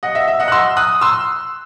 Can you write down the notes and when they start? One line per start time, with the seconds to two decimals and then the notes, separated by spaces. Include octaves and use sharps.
0.03 D#5 F#5
0.15 E5
0.28 E5
0.40 D#5 F#5
0.48 F#6
0.52 C6 E6
0.77 D#6 F#6
1.01 C6 E6